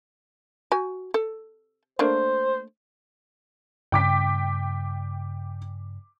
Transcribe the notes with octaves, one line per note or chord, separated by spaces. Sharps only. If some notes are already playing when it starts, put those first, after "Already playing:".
F#4 G#5
A4
A3 A#3 D4 C5
G2 C#3 G5 D6 B6